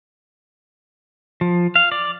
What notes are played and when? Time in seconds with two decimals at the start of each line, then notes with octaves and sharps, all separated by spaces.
1.41 F3
1.76 F5
1.92 D5